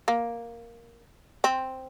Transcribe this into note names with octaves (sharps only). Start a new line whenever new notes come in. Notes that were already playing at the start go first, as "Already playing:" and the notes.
A#3
C4